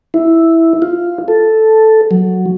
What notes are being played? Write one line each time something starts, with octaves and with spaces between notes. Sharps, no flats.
E4
F4
A4
F#3